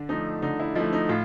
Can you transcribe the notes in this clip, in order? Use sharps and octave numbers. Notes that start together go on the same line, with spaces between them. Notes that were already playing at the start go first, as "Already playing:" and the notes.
Already playing: D3 D4
F3 A3 D#4
D3 D#4
E4
F3 A3 E4
D#4
A2 F4